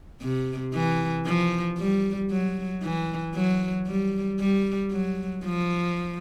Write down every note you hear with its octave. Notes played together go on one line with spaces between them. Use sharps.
C3
E3
F3
G3
F#3
E3
F#3
G3
G3
F#3
F3